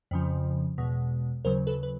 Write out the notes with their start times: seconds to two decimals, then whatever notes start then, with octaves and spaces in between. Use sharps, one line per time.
0.11 F2 C#3 F3
0.78 E2 B2 G#3
1.45 D#2 C#3 F#3 A#4 C5
1.67 A4 B4
1.83 B4